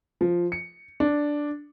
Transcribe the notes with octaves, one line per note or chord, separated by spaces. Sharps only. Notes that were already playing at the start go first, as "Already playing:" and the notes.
F3
C#7
D4